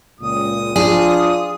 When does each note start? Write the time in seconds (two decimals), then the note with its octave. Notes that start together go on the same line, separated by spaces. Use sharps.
0.20 C#2 A#2 D#6
0.76 F3 D4 F4 G#4